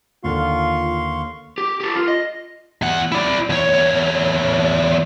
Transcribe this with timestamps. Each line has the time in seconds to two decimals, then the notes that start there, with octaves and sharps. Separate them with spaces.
0.24 D#2 D3 F4 F5 C6 C#6
1.58 G4
1.80 G4 A4
1.96 F4
2.08 D#5
2.82 E2 F#5
3.12 E4 D5
3.50 E2 C#5